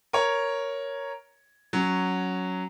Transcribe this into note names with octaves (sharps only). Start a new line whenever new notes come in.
A#4 C#5
F#3 C#4